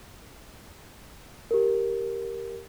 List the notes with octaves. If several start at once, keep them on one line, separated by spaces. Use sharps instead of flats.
G4 A#4